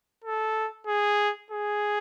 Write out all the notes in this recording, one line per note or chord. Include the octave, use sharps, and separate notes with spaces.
A4
G#4
G#4